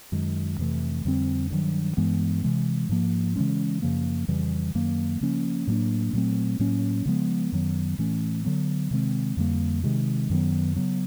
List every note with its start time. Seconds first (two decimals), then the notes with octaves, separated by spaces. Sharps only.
0.12 F#2 D#3 G#3
0.59 F2 C3 E3 A3
1.05 F2 D3 G3 C4
1.50 G2 D#3 F#3
1.97 G2 E3 G#3 B3
2.43 C3 E3 G#3
2.89 G#2 F3 A#3
3.36 C#3 E3 G#3 C#4
3.82 F#2 C#3 F3 A#3
4.28 F2 C#3 E3 G3
4.75 F#2 D#3 F#3 A#3
5.21 C#3 F3 A#3 C#4
5.67 A2 F#3 A#3 D4
6.13 A#2 F#3 A3 C4
6.59 A2 F#3 A#3 C#4
7.06 C#3 F3 G#3 B3
7.52 F#2 D#3 F#3 B3
7.98 A2 E3 A3 C#4
8.45 D3 F#3 B3
8.91 C3 D#3 G#3 C4
9.37 F2 D3 G3 A#3
9.84 C3 D#3 G#3
10.30 F#2 D#3 F#3 B3
10.76 C#3 F#3 B3